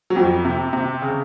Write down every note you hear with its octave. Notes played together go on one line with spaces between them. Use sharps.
F#3
F2 F3
C3
C3
C#3